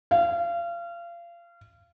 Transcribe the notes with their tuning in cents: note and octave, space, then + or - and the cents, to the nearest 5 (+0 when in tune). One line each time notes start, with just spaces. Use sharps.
F5 -30